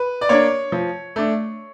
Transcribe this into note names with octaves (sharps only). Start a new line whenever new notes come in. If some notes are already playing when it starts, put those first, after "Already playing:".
Already playing: B4
D5
A#3 D4 C#5
F3
A3 D4